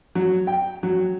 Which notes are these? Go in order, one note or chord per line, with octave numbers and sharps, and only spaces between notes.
F#3
G5
F#3